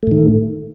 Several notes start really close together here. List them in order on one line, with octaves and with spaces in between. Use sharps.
A3 A2 D#3